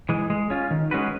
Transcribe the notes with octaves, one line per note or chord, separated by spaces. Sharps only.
E3 G#3
G#3
C#4 F4
D#3
G#3 C#4 F#4 B4